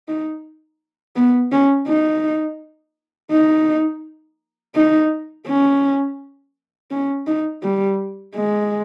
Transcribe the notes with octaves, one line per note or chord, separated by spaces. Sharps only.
D#4
B3
C#4
D#4
D#4
D#4
C#4
C#4
D#4
G3
G#3